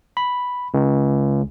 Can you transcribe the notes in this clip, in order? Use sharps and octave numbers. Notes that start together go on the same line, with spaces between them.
B5
C#2